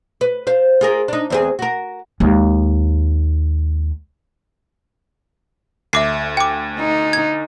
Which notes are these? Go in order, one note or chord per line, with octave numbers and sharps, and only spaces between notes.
B4
C5 F5
F4 G#4 A#4
D4 D#4
E2 C4 G#4
F#4 A#4
D#2 G#3
D2 E5 D6 C7
G5 D6
D#4
G#6